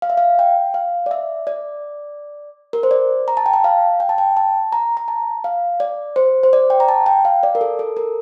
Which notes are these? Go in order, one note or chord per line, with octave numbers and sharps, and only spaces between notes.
F5
E5
F5
G5
F5
D5
E5
D5
A#4
C5
D5
A#5
A5
G5
A5
F5
G5
A5
G5
A5
A#5
A#5
A5
F5
D5
C5
C5
D5
G5
A#5
A5
G5
F5
D5
A#4
A4
A4
A#4